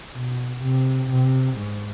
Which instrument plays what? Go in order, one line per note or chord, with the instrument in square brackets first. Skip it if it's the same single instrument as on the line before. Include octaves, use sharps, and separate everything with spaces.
[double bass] B2
C3
C3
G#2